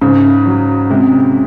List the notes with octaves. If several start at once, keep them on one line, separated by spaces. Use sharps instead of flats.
G#2 C#3
F#3
C3 G#3